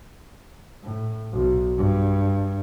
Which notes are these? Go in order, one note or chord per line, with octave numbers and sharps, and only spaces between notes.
A2
B1
G2